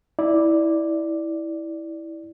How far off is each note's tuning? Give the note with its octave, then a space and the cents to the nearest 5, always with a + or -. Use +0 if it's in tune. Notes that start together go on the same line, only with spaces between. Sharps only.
E4 -15 D5 +0